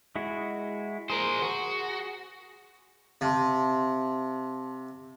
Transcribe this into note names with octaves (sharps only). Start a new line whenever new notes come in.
G#3 E4 F#4
G#4 A#4 C5
F#4
C3 F5 A5 C6